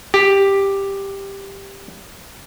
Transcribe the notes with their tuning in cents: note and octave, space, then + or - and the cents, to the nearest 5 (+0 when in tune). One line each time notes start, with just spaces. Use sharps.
G4 +5